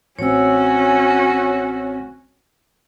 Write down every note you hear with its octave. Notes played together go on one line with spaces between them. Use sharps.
A1 C4 C#4 F#4 C#5 E6